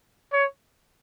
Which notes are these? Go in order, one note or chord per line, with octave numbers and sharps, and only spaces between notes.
C#5